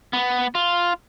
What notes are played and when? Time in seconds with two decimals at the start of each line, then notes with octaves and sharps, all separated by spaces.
0.13 B3
0.55 F4